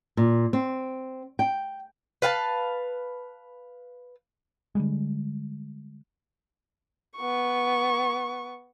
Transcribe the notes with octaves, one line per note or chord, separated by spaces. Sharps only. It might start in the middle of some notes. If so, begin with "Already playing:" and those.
A#2
C4
G5
B4 F5 G5 A5
D3 E3 G3 G#3
B3 C#6